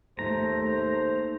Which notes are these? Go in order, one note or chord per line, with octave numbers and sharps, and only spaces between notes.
D#2 A3 C5 A#5